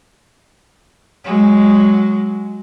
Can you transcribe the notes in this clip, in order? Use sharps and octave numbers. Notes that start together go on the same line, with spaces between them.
F#3 G#3